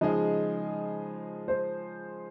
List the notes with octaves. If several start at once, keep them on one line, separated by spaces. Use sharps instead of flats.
C#3 F3 G#3 D#4 G#4 D#5
C5